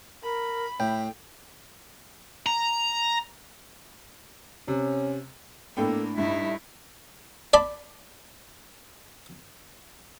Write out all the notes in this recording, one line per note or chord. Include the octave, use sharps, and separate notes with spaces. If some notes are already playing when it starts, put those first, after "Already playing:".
A#4 B5
A2 E5 G5
A#5
C3 C#4
A2 A#3 B3 D4 A4 G5
G2 D#4 E4 E5
D5 A5 B5